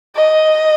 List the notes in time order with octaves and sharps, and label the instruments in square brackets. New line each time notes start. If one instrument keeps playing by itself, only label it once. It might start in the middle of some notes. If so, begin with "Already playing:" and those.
[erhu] D#5